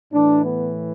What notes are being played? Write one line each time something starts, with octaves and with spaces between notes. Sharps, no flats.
A2 E3 D4
B3